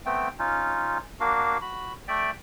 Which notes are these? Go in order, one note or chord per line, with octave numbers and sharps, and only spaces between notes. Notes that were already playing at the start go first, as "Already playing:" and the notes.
A3 B3 C4 G5
C#4 D#4 F4
A#3 D4 F#4 F5
F#4 B5
A3 D5 E5 G5